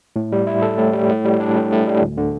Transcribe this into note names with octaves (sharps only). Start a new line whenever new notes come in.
A2
G3
E4
A4
A2
G3
A2
G3
D4
A2
A2
G3
D2
D3